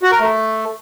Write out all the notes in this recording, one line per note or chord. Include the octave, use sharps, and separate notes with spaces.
F#4
A#4
A3